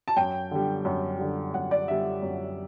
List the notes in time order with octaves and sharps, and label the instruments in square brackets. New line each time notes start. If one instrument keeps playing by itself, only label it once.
[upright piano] A5
F#2 G5
D3 G3
F#2
D3 G3
F#2 F#5
D5
D3 G3 E5
F#2